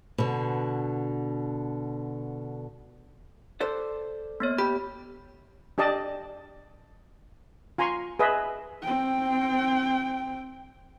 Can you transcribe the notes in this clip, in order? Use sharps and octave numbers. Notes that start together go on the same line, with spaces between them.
B2 D3
A4 C5 D5
A#3 B3 C#5
G4 B5
D4 G4 D5 D#5 A5
F4 G#5 A#5 C6 C#6
G#4 B4 D#5 E5
C4 G5